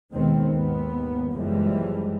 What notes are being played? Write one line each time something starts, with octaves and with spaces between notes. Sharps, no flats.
D#2 B2 D#3 G#3 B3 C4
G#1 D#2 B3
F#1 F#2 E3 F3 G3 G#3